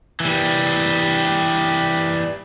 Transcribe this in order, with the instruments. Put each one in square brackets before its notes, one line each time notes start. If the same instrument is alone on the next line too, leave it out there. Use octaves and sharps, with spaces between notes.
[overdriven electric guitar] E3 G3